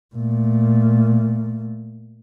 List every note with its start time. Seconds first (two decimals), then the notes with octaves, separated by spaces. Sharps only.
0.15 A#2 A3